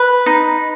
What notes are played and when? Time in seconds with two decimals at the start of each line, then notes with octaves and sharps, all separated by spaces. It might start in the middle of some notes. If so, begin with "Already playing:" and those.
Already playing: B4
0.26 D#4